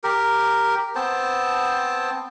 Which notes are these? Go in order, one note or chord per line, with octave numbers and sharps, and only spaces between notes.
G4 A#4
B3 C4 C5 A5